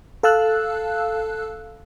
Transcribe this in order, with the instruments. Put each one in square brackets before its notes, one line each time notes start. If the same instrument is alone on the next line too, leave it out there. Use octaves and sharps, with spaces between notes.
[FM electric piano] A4 F5 A5 E6 F#6